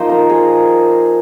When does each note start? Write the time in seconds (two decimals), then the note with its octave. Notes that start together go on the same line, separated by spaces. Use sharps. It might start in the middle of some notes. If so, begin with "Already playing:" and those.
Already playing: F3 A#3 D#4 C5 D#5
0.09 A#4
0.30 G#4